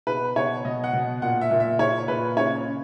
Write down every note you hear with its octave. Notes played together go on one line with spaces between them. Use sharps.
B2 B4
B2 C#5
B2 D#5
F#5
B2
A#2 F#5
E5
A#2
E5
A#2 C#5
A#2 B4
C#3 C#5
C#3